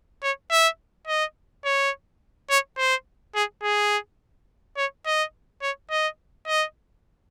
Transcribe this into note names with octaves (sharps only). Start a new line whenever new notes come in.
C#5
E5
D#5
C#5
C#5
C5
G#4
G#4
C#5
D#5
C#5
D#5
D#5